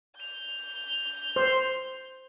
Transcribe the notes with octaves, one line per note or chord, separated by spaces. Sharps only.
G6 F7
C5